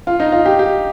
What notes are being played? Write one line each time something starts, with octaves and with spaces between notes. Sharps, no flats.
F4
D#4
F4
G4
G4